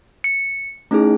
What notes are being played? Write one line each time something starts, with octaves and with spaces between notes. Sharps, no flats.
C#7
A3 C#4 D#4 E4 G#4